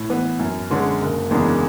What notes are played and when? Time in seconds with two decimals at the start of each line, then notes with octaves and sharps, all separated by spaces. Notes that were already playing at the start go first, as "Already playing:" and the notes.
Already playing: A2
0.09 E3 B3
0.39 F#2
0.70 D3 G#3 C#4
1.00 F#1
1.31 E2 C#3 G#3 D4